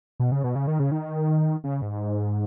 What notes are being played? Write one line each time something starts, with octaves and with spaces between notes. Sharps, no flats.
B2
C#3
B2
C#3
D#3
C#3
D#3
C#3
G#2